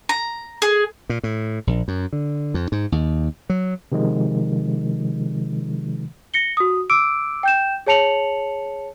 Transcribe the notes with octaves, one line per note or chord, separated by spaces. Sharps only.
A#5
G#4
A#2
A2
A#1
F#2
D3
F2
G#2
D#2
F#3
C3 D#3 F3 G#3
A#6 C#7 G7
F#4 D#6
D6 E6 D7
G5 G6 E7
G#4 C#5 A5 C#7 F7 F#7